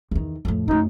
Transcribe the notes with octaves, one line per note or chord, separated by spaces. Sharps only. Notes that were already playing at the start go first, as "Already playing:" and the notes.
E2 D#3
F2 A2
F#2 A3 D#4